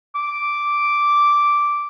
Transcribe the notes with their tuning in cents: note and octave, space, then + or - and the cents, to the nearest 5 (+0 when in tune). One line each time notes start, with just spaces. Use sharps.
D6 -5